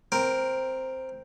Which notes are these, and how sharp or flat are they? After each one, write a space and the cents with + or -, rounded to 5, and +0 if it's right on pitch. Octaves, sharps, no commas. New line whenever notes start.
C4 +0 A#4 +0